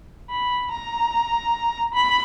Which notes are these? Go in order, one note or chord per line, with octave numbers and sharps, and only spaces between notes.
B5
A#5
B5